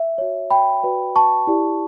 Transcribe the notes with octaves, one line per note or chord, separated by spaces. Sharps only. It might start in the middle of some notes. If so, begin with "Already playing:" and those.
Already playing: E5
F#4 C#5
G5 B5
F#4 B4 D5
A5 C#6
E4 G4 D5